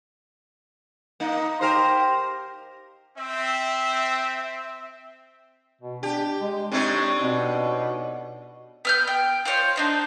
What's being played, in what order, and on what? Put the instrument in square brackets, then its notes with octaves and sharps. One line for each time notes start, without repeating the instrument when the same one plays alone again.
[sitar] A#3 D#4
G4 A#4 C5
[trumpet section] C4 E5
[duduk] B2
[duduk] D4 [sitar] G4
[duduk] G#3
[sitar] A2 D4 D#4 [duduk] C4
[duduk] B2
[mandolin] B3 F6 G6
G5
F4 C5 C#5 F5
D4 D#4 C5